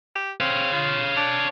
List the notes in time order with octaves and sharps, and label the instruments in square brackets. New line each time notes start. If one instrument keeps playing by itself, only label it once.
[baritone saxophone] G4
[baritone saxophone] C4 [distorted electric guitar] C#5 F5
[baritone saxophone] F4
D4